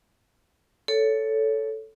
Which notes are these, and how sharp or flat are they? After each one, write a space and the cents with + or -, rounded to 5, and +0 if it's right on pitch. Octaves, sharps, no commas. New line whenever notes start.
A4 +0 C#5 +15